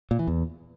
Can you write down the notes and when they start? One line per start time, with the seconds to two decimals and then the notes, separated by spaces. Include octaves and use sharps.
0.11 A#2
0.19 E3
0.27 E2